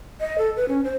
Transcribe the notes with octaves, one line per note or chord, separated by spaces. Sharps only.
D#5
A4
B4
C#4
C5